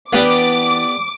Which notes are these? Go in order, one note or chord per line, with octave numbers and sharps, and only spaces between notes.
E3 B3 D4 G4 B4 F5 D6